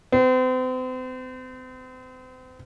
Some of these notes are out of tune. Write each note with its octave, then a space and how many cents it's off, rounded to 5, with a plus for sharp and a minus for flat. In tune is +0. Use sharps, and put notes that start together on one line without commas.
C4 -40